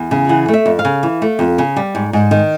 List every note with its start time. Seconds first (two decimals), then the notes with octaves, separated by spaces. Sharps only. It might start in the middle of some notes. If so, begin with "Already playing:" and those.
Already playing: E2
0.11 C#3
0.29 E3 F#5
0.48 A3
0.53 E5
0.66 F2
0.79 F5
0.85 C#3
1.03 E3
1.22 A3
1.39 F2
1.58 C#3
1.76 G3
1.95 G#2
2.13 G#2
2.31 D#3